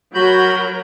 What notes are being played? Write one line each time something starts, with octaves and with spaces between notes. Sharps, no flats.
F#3 F#4 A#4 B5 G6